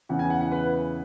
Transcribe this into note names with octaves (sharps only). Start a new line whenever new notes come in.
E2 C#3 E3 F#5
G#5
F#5
F#5
B4